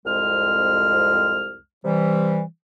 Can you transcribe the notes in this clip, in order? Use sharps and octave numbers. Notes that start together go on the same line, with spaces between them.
C2 F2 G#3 F6
C3 E3 G3